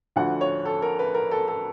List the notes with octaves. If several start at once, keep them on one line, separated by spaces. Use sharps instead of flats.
D2 D3 F3 F#5
C#5
A4
A#4
B4
A#4
A4
A4